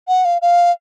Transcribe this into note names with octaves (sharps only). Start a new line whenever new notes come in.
F#5
F5
F5